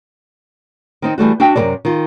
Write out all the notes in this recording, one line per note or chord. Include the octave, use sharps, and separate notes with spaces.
D#3 C4 D#4
E3 G3 A3 F#4
D4 F#4 F5 G5
F#2 C3 D#3 E3 A#4 D5
D#3 F4